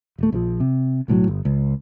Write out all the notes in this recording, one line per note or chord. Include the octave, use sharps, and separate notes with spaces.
D#1 A3
A#1 D#3 F3
C3
B1 A2 E3 F#3
G1
C#2